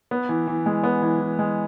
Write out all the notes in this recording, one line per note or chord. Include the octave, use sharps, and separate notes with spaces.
B3
E3
E3
G#3
B3
E3
E3
G#3